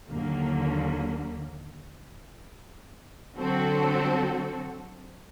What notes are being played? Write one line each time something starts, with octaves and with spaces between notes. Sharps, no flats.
D#2 D3 F#3 A#3
D3 F#3 C4 F#4 A4